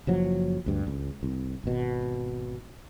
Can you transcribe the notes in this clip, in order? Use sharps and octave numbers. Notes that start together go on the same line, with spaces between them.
F#1 F3 F#3
D2 G2
C#2
C2
G#1 B2